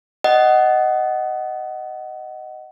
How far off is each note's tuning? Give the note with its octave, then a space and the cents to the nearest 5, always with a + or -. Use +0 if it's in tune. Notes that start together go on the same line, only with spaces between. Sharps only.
D#5 +0 F#5 +20